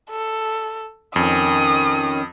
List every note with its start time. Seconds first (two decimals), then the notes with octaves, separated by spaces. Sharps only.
0.10 A4
1.16 F2 D#3 C#4 D#6